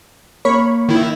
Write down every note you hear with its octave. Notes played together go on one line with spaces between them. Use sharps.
A#3 C#5 B5 C#6
D#3 E4